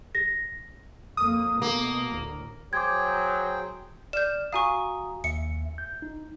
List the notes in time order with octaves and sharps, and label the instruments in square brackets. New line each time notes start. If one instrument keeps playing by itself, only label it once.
[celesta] A#6
[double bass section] F2 A#3 [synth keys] D#6
[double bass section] B2 A3 [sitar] A#3
[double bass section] D2 A2
[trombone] F#3 [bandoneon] G#4 C5 G5 [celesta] D6 G#6
[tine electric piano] D5 F6 [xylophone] G6 E7
[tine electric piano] F#4 A#5 D#6 [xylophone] F5 G#5 C#6
[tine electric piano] D#2 E5 [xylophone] C#7
[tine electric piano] G6
D#4